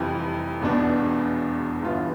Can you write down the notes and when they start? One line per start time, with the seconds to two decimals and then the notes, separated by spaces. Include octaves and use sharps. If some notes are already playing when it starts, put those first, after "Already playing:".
Already playing: F1 F2 E3 G3 C4
0.61 E1 E2 B2 B3 D4
1.82 G1 G2 E3 B3 F4